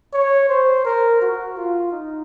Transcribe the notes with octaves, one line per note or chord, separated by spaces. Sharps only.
C#5
C5
A#4
F#4
F4
D#4